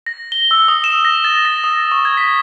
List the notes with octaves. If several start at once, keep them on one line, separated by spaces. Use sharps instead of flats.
A#6
G7
E6
D#6
E7
A#6
A6
A#6
D#6
C#6
G#6
B6